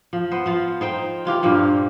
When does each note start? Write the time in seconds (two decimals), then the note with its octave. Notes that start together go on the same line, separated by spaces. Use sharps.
0.13 F3
0.31 B3 C5
0.46 F3 F4
0.81 D#4 C5 G5
1.25 E3 F4 G4 A#4
1.43 G2 A#2 F3 A#3